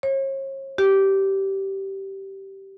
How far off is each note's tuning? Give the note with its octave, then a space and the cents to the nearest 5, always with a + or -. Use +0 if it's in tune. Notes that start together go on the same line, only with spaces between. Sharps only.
C#5 -40
G4 -15